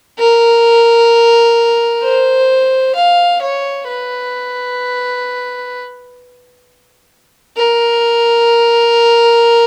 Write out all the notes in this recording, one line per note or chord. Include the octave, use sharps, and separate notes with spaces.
A#4
C5
F5
C#5
B4
A#4